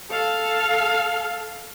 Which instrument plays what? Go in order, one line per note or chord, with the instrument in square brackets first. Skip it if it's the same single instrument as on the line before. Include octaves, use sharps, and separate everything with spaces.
[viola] A4 F5